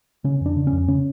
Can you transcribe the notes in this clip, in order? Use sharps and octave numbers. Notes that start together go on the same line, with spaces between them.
C#3 C#4
F2 D4
C#3
C#4
F2
C#3 C#4